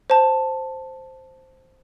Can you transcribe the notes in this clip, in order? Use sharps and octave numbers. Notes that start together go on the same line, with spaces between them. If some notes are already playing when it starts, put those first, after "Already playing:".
C5 A5